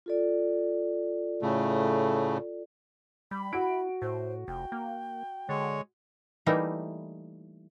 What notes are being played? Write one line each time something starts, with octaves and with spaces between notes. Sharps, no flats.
F4 A4 D5
A2 C#3 A3
G3 B5
E4 F#4 D7
A2 C5
F1 G5
A#3
D3 G#3 C#5
E3 G3 A3 A#3 D#4 E4